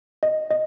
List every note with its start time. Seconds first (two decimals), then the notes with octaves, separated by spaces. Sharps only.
0.23 D#5
0.51 D#5